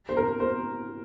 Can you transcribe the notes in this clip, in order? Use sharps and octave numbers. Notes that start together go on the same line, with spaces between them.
C5
A#4
C5